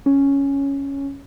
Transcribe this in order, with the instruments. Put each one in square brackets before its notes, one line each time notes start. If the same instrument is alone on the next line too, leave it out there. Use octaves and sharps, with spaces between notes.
[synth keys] C#4